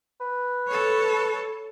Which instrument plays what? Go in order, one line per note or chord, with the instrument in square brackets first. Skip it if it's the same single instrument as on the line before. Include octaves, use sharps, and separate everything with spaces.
[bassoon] B4
[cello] A4 C#5